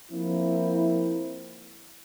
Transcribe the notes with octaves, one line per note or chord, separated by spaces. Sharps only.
F3 A#3 C4 E4